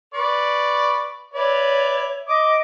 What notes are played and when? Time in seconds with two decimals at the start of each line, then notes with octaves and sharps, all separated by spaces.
0.14 B4 D5 C#6
1.34 B4 C#5 D5 E5
2.28 D#5 D6 D#6